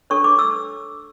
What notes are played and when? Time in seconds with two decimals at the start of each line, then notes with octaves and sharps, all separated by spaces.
0.10 D4 A4 C#5 C#6
0.24 D6
0.39 E6